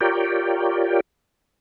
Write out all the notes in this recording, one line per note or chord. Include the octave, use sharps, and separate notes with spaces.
F4 G4 A#4 C#5 D5 G5